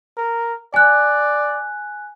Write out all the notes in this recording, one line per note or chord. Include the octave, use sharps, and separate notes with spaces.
A#4
D5 G#5 F#6